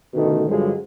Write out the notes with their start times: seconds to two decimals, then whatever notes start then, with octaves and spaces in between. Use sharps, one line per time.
0.14 A1 B2 D3 D#3 A3
0.48 G2 D3 F3 F#3 G#3